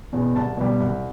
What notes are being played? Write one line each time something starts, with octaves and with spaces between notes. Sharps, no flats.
E2 B2
C2 A5
B2 G3
C2